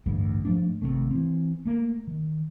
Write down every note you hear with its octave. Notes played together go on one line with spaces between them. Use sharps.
A1 D2 G2 G3
G#2 F3 A3 D4
G#1 F2 C3 A3
E3 C4
A3 A#3
D#3